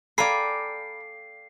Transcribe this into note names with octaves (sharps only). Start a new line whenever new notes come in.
A4 D5 F5 G5 G#5 A#5 B5 C7